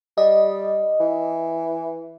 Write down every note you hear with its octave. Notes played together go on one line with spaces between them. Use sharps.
G3 D#5
E3